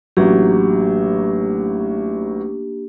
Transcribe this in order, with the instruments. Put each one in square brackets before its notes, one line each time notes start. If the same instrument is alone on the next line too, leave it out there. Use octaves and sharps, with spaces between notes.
[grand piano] A1 F#3 [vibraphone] A#3 D4 G4